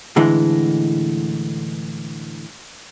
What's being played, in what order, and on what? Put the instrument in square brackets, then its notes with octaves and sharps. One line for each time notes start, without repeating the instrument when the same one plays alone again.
[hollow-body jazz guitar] A2 D3 E3 G#3